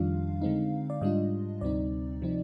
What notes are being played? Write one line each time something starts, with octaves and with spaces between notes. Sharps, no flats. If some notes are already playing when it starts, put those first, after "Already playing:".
Already playing: F2 D#3 G3 D4 F4 F5
D3 G#3 C4 D#4
D5
G#2 G3 D4 F4 D#5
D2 C3 G3 C4 D#4 D5
C3 F3 C4 D#4